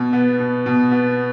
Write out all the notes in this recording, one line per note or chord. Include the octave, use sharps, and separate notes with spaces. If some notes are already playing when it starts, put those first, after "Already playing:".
Already playing: B2
B3
B2
B2
B3